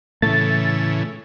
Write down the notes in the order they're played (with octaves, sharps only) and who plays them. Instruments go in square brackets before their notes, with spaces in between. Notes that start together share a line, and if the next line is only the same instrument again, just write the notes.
[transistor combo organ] A2 C#3 E3 [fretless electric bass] A3 [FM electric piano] A6